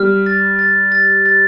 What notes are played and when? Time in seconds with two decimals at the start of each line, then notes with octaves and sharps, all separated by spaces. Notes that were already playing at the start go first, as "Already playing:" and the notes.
Already playing: G3 F6
0.26 A6
0.59 A6
0.92 A6
1.26 A6